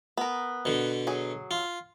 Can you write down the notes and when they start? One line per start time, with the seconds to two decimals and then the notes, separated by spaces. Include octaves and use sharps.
0.17 B3 A#4
0.65 B2 D3
1.07 F#3 G#4
1.51 F4